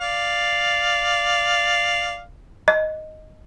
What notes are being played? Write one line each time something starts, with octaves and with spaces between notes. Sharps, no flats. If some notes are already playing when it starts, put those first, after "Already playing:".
D5 F5
D#5